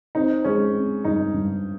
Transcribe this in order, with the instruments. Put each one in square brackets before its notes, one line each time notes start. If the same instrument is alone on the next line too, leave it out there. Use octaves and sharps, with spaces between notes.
[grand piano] C4 [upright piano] D#4
[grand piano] G#3 [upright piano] C#4
[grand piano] C4
[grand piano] G2 [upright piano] D#4
[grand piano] G2